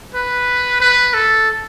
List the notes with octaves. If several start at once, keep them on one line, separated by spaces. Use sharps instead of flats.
B4
B4
A4